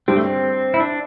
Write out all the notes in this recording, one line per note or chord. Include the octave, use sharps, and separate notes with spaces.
G2 G3 C4 D4 G4
A3
C4
E4
D4